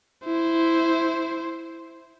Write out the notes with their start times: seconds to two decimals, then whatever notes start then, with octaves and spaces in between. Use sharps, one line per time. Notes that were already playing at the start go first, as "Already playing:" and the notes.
0.25 E4 C5